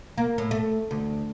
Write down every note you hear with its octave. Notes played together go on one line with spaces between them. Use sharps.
A#3
A2
A3
D2